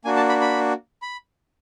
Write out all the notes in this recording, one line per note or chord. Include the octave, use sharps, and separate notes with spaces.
A#3 D4 F#4 G#5
A5
B5
B5
B5